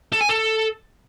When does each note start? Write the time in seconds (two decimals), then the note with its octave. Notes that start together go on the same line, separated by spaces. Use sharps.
0.12 A4
0.21 G#5
0.29 A4